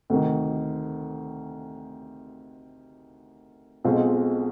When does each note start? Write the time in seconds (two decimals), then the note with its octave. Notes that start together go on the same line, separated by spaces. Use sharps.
0.10 D2 C3 D#3
3.84 B1 B2 G#3 C4 F4